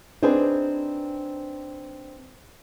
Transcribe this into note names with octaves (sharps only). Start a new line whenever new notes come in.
C4 D4 D#4 G#4 B4 C5